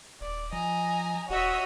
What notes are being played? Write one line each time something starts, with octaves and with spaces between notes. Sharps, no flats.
D#1 D5
F3 D#5 G#5 A#5
D#1 F#4 C#5 D#5 E5